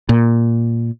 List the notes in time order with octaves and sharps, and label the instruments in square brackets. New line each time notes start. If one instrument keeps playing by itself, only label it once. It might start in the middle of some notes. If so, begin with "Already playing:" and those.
[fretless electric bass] A#2